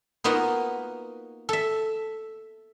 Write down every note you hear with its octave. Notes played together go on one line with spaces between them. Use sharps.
A#3 B3 D#4 F4 F#4 D#5
A4 E5